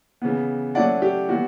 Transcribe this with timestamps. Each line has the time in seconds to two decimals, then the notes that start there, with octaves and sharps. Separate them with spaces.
0.22 C#3 E3 B3
0.75 F#3 A3 C#4 E4 D5 F#5
1.02 G4
1.29 E3 G3 B3 E4 F#4